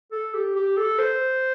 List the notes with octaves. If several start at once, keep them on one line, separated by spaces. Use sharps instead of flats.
A4
G4
G4
A4
C5